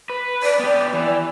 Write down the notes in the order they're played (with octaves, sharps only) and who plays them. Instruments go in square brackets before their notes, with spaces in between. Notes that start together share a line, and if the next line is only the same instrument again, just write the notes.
[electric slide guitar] B4
[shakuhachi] D5
[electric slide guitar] B3 G4
E3